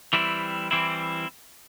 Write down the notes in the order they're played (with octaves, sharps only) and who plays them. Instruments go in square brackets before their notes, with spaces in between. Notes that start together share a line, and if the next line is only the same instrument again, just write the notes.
[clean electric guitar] E3 G3 C4 E4
E3 G3 C4 E4